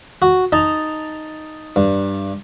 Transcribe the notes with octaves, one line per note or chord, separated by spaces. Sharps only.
F#4
D#4 A5 A#5
G2